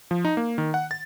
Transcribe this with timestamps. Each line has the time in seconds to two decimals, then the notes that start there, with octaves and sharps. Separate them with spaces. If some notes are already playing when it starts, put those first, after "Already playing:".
0.11 F3
0.25 D#4
0.37 A#3
0.58 D#3
0.74 F#5
0.91 A6